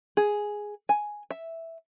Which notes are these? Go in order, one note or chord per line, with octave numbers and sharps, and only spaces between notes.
G#4
G#5
E5